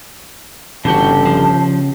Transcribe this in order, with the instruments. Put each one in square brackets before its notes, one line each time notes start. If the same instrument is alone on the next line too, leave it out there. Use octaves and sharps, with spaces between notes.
[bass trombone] G1 [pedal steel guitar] C#3 G4 G5 [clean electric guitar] E3 F#4 [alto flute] A5
[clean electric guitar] F3